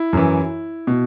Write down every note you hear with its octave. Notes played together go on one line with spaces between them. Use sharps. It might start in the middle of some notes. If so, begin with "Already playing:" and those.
Already playing: E4
F#2 E3
B2